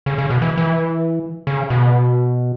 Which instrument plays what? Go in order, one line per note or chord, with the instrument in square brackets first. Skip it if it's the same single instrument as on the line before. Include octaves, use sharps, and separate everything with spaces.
[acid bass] C#3
C#3
B2
E3
E3
C#3
B2